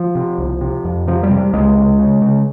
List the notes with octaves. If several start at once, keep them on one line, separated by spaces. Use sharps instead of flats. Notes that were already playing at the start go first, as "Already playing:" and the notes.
Already playing: F3
C3
C2
C3
F2
C3 F3
G3
C3
G3
C#2 G#3
C#2
C#3
C#3